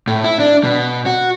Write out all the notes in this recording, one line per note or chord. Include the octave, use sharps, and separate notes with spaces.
A2
E4
D4
B2
F#4